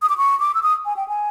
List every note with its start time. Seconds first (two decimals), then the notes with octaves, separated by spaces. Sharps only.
0.02 D#6
0.09 D6
0.18 C#6
0.40 D6
0.54 E6
0.63 D#6
0.85 G#5
0.97 G5
1.08 G#5